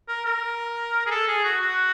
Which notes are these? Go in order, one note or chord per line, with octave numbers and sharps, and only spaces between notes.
A#4
A#4
G#4
A4
G#4
F#4
F#4